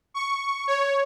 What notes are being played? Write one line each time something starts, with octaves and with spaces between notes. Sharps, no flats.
C#6
C#5